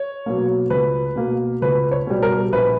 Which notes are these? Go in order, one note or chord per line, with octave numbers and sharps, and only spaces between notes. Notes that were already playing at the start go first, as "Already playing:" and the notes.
Already playing: C#5
B2 F#3 A#3
C#2 B4
B2 A#3
C#2 B4
C#5
B2 G3
A#4
A#1 B4